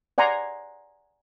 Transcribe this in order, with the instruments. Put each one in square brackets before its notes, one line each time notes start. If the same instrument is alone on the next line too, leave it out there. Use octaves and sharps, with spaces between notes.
[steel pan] D5 F#5 G#5 A#5 C6